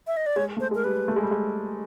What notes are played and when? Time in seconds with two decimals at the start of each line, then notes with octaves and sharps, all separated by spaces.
0.07 E5
0.17 D#5
0.26 D5
0.36 G#3 C#5
0.57 A3 C5
0.71 G#3 A#4
0.84 G3 B4
1.08 A3
1.16 G#3
1.23 G3
1.31 G#3